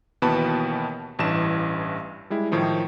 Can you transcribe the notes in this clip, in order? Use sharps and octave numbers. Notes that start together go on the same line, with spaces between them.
D#2 B2 E3 B3 A5 B5
A1 G2 E3 A5 E7
G3 G#3 E4
A2 D#3 F3 D#4